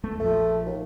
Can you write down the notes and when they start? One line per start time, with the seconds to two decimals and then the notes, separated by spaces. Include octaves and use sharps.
0.03 F#1 E2 A3
0.20 A#1 F3 A3
0.66 D#2